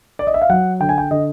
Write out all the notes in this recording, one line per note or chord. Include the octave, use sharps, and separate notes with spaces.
D5
D#5
E5
F5
F#3 F#5
D3 G5
G#5
G5
D3 D#5